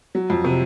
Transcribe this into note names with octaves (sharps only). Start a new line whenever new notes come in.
F#3
F2
C3